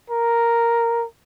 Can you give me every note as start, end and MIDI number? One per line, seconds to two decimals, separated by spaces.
0.10 1.05 70